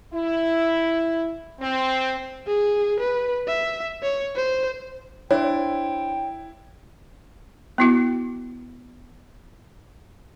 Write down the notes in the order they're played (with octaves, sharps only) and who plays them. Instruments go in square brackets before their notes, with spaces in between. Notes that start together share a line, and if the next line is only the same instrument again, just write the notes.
[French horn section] E4
C4
[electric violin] G#4
B4
E5
C#5
C5
[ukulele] D4 C5 [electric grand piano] E4 [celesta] C#5 [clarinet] G5
[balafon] B3 E4 F#4